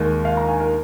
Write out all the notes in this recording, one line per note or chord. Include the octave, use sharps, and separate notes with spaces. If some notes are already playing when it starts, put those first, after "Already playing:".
Already playing: D#2 D#3 G#3
F5
A#5
G#5
A#4